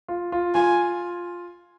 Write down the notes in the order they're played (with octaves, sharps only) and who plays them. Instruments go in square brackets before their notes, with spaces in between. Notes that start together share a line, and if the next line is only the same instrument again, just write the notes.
[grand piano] F4
F4
[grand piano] F4 [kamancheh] G#5